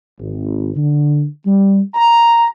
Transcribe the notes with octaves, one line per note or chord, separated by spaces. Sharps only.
G#1
D3
G3
A#5